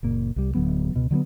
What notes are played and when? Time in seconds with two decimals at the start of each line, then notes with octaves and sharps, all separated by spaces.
0.03 F#1 A#2 A#3
0.36 C2 G3
0.54 D1 D3 F#3 B3
0.94 C#2 B2
1.11 D3 F#3 A#3 B3